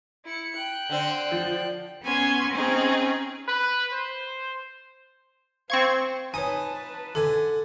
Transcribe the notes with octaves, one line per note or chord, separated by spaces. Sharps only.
E4 C#7
G5 F#6
D3 C4
F3
B3 C#4 G#5 C6
C4 C#4 D#4 G#4
B4
C5
C4 C5 F5 C#6 G#6
D#4 B4 C#5 G#5 A5
D3 A4 G#5